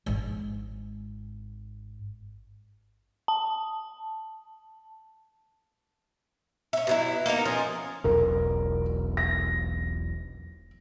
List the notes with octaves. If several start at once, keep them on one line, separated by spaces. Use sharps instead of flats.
G#1 G#2
A5
C#4 E5
B2 F#3 E4
A#3 B3 D#4 A#4
F3 C#4 G#4 A#4
E1 B1 A#4
A#6